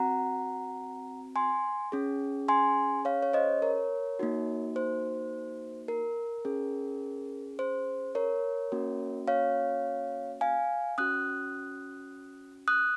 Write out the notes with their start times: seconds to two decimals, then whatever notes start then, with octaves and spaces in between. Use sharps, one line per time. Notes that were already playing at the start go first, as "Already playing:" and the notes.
Already playing: C4 F#4 F#5 A#5
1.36 G#5 C6
1.92 C#4 G#4
2.48 G#5 C6
3.05 C#5 F5
3.23 C#5
3.33 C5 D#5
3.62 A#4 C#5
4.19 A#3 D#4 F#4
4.76 C5
5.88 A#4
6.45 C#4 G#4
7.59 C5
8.15 A#4 C#5
8.72 A#3 C#4 F#4
9.28 C#5 F5
10.41 F5 G#5
10.98 C#4 F#4 D#6 F#6
12.68 D#6 F#6